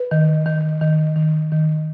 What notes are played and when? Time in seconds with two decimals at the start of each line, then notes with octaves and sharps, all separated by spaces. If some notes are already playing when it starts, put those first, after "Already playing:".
Already playing: B4
0.11 D#3
0.46 D#3
0.81 D#3
1.16 D#3
1.52 D#3